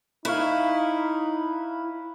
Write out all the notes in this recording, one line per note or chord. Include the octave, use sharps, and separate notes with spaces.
D#4 E4 B4 C#5 F5